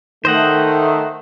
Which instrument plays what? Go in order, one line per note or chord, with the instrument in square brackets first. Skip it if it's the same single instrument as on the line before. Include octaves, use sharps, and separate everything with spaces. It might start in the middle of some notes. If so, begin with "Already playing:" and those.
[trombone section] D#3 A3 [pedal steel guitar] C5 D#5 F#5